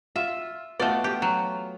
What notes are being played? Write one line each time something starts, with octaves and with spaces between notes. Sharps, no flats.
F4 E5
A3 B3 F4 F#4 D5
G4
F#3